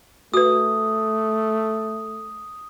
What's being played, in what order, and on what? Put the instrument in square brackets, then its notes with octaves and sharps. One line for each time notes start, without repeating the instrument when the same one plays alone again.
[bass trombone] A3 [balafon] F#4 B4 [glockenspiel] D#6